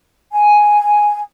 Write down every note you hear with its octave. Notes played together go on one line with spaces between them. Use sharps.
G#5